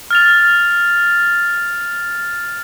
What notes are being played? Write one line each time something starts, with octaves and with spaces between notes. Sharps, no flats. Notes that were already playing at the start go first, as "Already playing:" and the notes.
F6 A6 F7